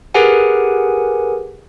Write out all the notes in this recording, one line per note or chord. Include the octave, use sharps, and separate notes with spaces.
G4 G#4 A#4 B4 F#5 G#5